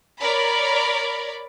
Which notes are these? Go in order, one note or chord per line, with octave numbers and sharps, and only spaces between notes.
A#4 C#5 D5 B5